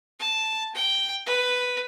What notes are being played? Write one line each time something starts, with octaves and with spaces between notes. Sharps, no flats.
A5
G5
B4